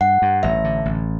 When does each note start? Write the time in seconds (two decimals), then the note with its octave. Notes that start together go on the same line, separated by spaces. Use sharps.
0.01 G2 F#5
0.22 G2
0.43 A1 E5
0.64 D3
0.85 A1